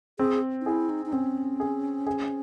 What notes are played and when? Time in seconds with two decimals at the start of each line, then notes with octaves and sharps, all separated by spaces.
0.19 C4 G#4
0.61 D#4
0.66 E4 G#4
0.90 D#4
1.06 D#4
1.13 C4 C#4
1.60 G#4
2.07 G#4